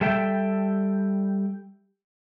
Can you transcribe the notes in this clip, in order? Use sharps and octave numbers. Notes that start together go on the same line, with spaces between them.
G3 A4 E5 G5